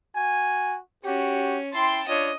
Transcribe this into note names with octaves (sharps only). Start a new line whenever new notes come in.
F#4 G#5
C#4 F#4 G4
E4 G5 A5 C6
D4 F4 C#5 D#5